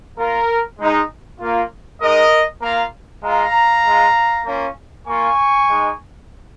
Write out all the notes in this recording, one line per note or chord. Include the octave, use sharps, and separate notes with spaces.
A#3 F4 A#4
G#3 D#4
A#3 F4
G#3 D#4 A#4 D#5
A#3 F4 F5 A#5
G#3 F4 F5 A#5
G#3 F4
A#3 C#4 F4
A#3 F4 G#5 C#6
G#3 D#4